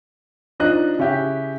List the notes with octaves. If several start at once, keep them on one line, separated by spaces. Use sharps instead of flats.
F3 D4 D#4 D#5 F#6
C#3 C#4 E4 G4